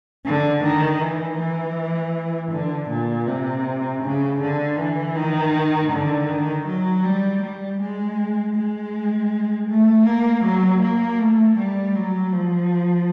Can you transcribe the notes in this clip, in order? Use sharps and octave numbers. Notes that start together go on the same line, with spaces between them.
D3
D#3
E3
E3
D3
A#2
C3
C#3
D3
E3
D#3
D3
D#3
F#3
G3
G3
G#3
G#3
A3
A#3
F#3
A#3
A3
G3
F#3
F3